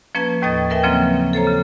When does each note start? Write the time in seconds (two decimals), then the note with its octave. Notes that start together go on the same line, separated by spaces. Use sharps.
0.15 F3 A#3 C#4 B4 A5 G#6
0.42 D#2 A2 D#5 D#6 A6
0.70 A#4 B4 E5 G5 G#5
0.83 C#3 F3 F#3 A#3 C4 C#4
1.33 A4 C5 C#5 A#5
1.47 C#3